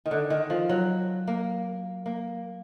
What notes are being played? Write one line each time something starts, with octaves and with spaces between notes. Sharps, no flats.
D#3
D3
D#3
F3
F#3
A#3
A#3